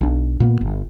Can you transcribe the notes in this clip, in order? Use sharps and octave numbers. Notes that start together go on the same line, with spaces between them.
B1 D4
A#2 A#3 B3
G1